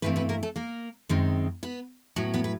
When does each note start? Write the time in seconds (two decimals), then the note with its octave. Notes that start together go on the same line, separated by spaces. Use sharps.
0.02 G2 E3 A3 B3 C4 B4
0.16 B3 B4
0.29 A#3 A#4
0.43 A3 A4
0.56 A#3 A#4
1.09 F#2 D#3 G#3 C4
1.63 B3 B4
2.16 A2 F#3 B3
2.34 B3 B4
2.44 B4